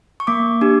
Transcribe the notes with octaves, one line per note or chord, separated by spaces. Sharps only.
C#6
A#3 D6
D4 G4